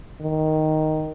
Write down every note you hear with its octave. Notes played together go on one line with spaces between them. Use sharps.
D#3